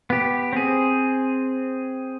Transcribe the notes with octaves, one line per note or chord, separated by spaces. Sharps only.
B3 G4
C4 G#4